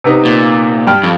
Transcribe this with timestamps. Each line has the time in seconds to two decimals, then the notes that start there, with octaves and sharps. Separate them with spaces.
0.04 C3 B3 D#4
0.25 A#2
0.87 G2 G5 F6
1.03 F2